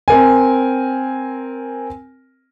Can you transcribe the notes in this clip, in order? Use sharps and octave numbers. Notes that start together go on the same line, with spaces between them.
C4 A#4 G#5